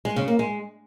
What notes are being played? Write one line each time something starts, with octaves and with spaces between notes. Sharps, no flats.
G#3
C#3
A#3
G#3